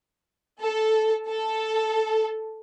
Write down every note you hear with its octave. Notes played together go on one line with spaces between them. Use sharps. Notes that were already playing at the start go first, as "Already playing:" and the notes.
A4
A4